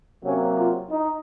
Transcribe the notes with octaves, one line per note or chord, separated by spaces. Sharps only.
C3 F#3 A#3 C#4
F4
D#4